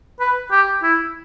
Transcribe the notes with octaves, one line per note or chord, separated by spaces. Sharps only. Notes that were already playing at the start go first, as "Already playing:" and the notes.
B4
G4
E4